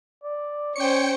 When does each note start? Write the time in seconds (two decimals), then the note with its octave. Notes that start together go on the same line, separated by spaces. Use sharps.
0.23 D5
0.76 C#4 C5 C#5 G5 C#7